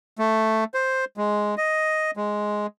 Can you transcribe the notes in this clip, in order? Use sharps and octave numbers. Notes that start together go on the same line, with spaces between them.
A3
C5
G#3
D#5
G#3